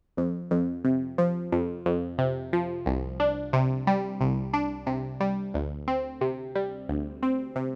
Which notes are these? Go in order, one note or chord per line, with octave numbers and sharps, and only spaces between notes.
F2
F2
C3
F3
F2
F2
C3
F3
C2
D4
C3
G3
C2
D4
C3
G3
D2
C4
C3
G3
D2
C4
C3